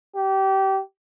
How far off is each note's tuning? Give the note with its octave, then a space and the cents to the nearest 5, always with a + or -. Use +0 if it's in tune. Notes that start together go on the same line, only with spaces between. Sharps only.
G4 -25